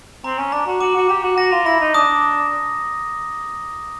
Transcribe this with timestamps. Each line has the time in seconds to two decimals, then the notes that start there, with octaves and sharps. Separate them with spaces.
0.24 C4 A#5
0.38 C#4
0.52 D4 A#5
0.67 F#4
0.81 F#4 D6
0.96 F#4
1.09 G4 A#5
1.23 F#4
1.38 F#4 A#6
1.52 F4
1.66 E4 A#6
1.81 D#4
1.94 D4 D#6